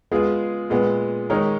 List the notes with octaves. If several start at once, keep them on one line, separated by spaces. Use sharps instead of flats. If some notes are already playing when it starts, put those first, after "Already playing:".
G#3 B3 F4 G#4
A#2 G#3 B3
D#3 G#3 D#4 A#4 C#5